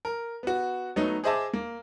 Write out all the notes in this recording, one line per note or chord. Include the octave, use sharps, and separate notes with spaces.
A#4
B3 F#4
F#3 A3 B3 D#4
G#4 C5 D#5 E5 A5 D6
A#3